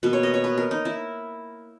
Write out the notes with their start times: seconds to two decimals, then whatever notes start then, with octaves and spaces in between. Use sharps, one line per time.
0.03 B2 A#3 B4
0.13 C#5
0.23 D#5
0.34 C#5
0.44 B4
0.58 A#4
0.71 D#4
0.85 E4